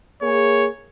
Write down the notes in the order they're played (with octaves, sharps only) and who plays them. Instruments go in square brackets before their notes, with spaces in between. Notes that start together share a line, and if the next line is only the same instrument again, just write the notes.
[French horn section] A#3 G#4 [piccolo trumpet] C#5